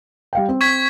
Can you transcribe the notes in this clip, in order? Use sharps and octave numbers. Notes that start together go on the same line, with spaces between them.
G3 F5 G5
C4
C#6 G#6 B6